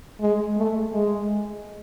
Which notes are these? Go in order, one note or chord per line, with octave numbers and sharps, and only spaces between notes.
G#3
A3
G#3